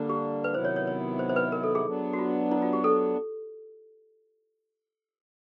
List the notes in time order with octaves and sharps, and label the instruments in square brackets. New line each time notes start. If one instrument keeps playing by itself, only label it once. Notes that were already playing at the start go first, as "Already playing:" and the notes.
Already playing: [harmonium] D3 G3 A#3 D4
[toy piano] G4
B4
[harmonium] C3 D#3 F#3 B3 E4 [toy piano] C5
[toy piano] C#5
C#5
C#5
C5
C5
B4
A#4
A4
G#4
[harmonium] F#3 B3 D4
[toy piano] F#4
F4
E4
F4
G4
A4